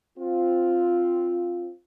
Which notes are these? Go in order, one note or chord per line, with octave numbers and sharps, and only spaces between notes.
C4 F4